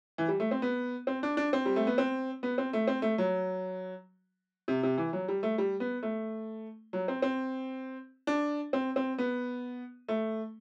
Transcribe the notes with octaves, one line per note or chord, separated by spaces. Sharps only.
E3
G3
A3
C4
B3
C4
D4
D4
C4
G3
A3
B3
C4
B3
C4
A3
C4
A3
F#3
C3
C3
E3
F#3
G3
A3
G3
B3
A3
F#3
C4
C4
D4
C4
C4
B3
A3